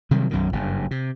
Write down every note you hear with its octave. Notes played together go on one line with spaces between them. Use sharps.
C3 D#3 F#3 G3
B1 F#2 B2 D#3
F#1 G2
C3